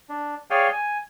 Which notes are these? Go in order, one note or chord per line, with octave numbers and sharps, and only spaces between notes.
D4
G#4 C#5 D5 F5 G5 G#5
G#5